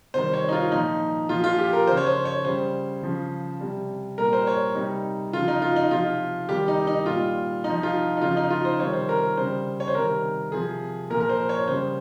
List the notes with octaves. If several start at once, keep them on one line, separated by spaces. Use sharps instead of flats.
C3 D#3 G3 C5
C#5
D#4
F4
A#2 F3 D#4
A#2 F3 F4
F4
G4
A#4
C#3 F3 C5
C#5
C5
C#5
C#3 G3 C5
C#3 F3
C3 G3
A#2 G3 A#4
C5
C#5
C3 G3 D#4
C#3 F3 F4
D#4
F4
D#4
C3 F3 F4
C3 D#3 G3 G4
D#4
D#4
A#2 G3 F4
C3 F3 D#4
F4
D#4
C#3 F3 F4
D#4
F4
C5
C3 D#3 G3 C#5
C5
A#4
C#3 G3 C5
C#5
C5
C3 D#3 G3 A#4
C3 F3 G#4
A#2 F3 A#4
A#4
C5
C#5
C#3 G3 C5